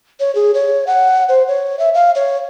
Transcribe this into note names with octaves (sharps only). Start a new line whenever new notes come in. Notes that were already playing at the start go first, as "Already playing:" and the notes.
C#5
G#4
C#5
F#5
C5
C#5
E5
F5
C#5